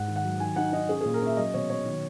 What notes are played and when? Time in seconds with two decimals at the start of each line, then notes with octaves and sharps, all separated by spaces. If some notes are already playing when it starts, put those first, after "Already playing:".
Already playing: G#2 F#5
0.08 D#3
0.16 F#5
0.25 F#3
0.40 D#3 G#5
0.56 D#4 F#5
0.72 D#4 D#5
0.89 C#4 G#4
1.01 A#2 G#4
1.14 A#4
1.22 C#4 E5
1.37 F#3 D#5
1.54 B2 C#5
1.70 F#3 C#5
1.85 D#3